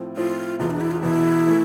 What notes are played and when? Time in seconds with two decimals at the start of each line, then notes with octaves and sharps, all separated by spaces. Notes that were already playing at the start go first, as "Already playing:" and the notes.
Already playing: A2 F3 C4
0.16 A2 F3 C4 F4
0.59 E1 E2 B2 F4
0.70 D4
0.81 E4
0.91 F4
1.02 E1 E2 B2 E4
1.46 E3 A3